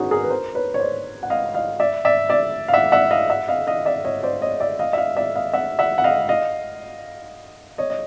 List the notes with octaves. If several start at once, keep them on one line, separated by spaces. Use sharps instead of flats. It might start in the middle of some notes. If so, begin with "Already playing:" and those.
Already playing: B3 C#4 D#4 F#4 G#4
G#4 A#4
B4
A#4 C5
B4 C#5
C#5
C5 D5
F#5
D#5 F5
D#5 F5
D5 E5
D5 E5
D5 E5
F5
E5 F#5
E5 F#5
D#5 F5
E5 F#5
D#5 F5
D#5 F5
D5 E5
C#5 D#5
C5 D5
C#5 D#5
D5 E5
D#5 F5
E5
D#5 F5
D5 E5
D#5 F5
E5 F#5
E5 F#5
F#5
D#5 F5
D#5 F5
C#5 D#5
D#5